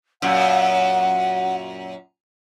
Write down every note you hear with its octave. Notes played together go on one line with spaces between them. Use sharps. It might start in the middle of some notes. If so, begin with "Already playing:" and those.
F#2 A#2 F#5